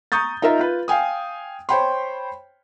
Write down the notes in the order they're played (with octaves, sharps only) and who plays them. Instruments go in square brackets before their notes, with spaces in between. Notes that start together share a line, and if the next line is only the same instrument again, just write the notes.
[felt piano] A#5 C#6 D#6 G6 A6
D#4 F4 A#4 E5 A#5
F4 B4
F5 G5 G#5 D#6
C5 C#5 G5 B5 C6